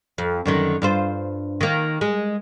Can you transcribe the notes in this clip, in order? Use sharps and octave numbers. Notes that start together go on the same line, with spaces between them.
F2
F#2 D3 D#3
G2 F4 C5
D#3 A#3
G#3